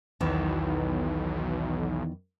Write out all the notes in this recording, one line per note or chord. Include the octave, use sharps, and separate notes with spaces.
B1 E2 D#3 E3